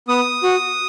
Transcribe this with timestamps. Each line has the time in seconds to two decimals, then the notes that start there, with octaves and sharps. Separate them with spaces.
0.08 B3 D#6
0.43 F#4